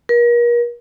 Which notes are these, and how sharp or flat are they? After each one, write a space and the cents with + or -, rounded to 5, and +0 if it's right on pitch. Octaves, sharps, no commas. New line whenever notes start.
A#4 +40